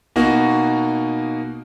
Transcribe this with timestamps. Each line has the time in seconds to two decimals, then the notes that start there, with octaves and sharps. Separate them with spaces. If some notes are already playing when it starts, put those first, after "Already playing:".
0.16 B2 A#3 D#4 F#4